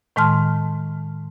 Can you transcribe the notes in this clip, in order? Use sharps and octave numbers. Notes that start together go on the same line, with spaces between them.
A2 D#3 G#3 A5 C6 F6